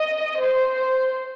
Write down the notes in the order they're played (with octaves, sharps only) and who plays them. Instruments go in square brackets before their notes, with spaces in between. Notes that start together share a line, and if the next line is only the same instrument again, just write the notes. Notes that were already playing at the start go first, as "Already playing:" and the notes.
Already playing: [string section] D#5
C5